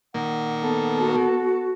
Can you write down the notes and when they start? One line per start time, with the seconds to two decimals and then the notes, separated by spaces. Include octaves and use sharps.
0.14 A#2 D#3 A#3 F#5
0.62 B3 A4
1.00 F#4